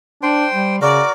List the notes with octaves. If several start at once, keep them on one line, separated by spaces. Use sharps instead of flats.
D4 C5 G5 C6
G3
C#3 F#4 A#4 D5